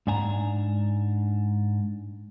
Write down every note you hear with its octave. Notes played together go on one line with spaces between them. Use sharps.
G#2 D4 G#5 A#5